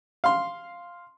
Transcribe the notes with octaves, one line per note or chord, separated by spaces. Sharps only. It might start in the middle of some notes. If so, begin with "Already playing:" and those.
F5 C6